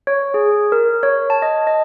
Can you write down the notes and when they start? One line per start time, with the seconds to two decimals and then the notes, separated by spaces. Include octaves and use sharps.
0.07 C#5
0.34 G#4
0.72 A#4
1.03 C#5
1.30 A5
1.42 D#5
1.67 D#5